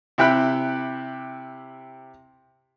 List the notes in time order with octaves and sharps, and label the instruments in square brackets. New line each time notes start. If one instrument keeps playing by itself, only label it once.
[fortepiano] C3 E4 G4 G5 B5 F#6